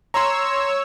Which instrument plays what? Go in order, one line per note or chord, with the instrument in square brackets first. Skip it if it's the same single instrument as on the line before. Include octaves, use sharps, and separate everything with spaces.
[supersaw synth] C#5 E6 [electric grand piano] A#5 C6